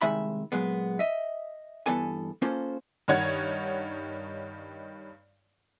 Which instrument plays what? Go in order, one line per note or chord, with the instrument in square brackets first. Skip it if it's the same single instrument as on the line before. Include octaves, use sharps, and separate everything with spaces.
[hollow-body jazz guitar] C2 D#3 G#3 E5 B5
A#2 F#3 G#3 B3
D#5 E5
G2 C3 E3 B3 A4 G#5
A#3 C#4 F4 A4 C5
[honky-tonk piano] G2 D#3 D#4 C#5 F#5 G#6